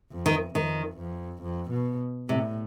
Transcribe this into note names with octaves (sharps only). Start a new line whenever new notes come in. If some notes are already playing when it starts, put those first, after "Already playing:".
F2
D#3
F2 D#3
F2
F2
B2
A2 C3